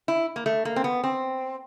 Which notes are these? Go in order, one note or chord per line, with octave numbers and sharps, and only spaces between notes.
E4
A#3
A3
A#3
C4
B3
C4